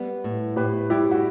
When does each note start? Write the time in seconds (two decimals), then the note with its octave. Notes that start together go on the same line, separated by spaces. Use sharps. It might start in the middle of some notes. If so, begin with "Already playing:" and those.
Already playing: G3 B3
0.24 A2
0.56 A2 G4 B4
0.90 G3 E4 G4
1.11 F#4